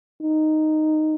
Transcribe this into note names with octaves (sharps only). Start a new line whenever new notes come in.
D#4